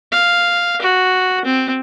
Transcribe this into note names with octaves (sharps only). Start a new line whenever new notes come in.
F5
F#4
C4